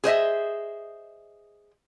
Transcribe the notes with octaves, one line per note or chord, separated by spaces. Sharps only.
G#4 C5 D#5 E5